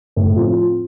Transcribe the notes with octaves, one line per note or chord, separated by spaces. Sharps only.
A2
F3 C4 F4